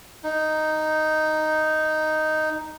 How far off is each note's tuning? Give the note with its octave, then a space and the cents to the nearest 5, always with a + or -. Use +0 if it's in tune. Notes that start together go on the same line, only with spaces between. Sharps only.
D#4 +0